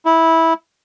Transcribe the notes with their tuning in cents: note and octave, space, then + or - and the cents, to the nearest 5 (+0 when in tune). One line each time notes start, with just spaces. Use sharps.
E4 -15